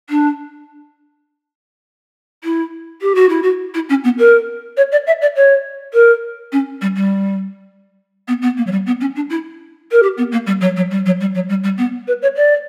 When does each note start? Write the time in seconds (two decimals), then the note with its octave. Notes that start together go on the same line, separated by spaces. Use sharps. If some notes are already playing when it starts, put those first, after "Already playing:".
0.10 D4
2.44 E4
3.02 G4
3.15 F#4
3.29 E4
3.43 F#4
3.74 E4
3.89 C#4
4.04 B3
4.19 A#4
4.77 C#5
4.92 D5
5.06 E5
5.21 D5
5.36 C#5
5.94 A#4
6.52 C#4
6.81 G3
6.96 G3
8.28 B3
8.42 B3
8.57 A#3
8.67 F#3
8.71 G3
8.86 B3
9.00 C#4
9.15 D4
9.30 E4
9.91 A#4
10.02 G4
10.17 B3
10.32 A#3
10.46 G3
10.61 F#3
10.76 F#3
10.90 G3
11.06 F#3
11.20 G3
11.35 F#3
11.49 G3
11.64 G3
11.78 B3
12.07 B4
12.22 C#5
12.36 D5